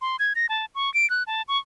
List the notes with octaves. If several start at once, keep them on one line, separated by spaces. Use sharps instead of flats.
C6
G#6
A#6
A5
C#6
D7
F#6
A5
C#6